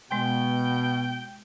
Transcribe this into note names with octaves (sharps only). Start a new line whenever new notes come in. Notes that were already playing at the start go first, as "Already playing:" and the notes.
B2 G#3 G5 C6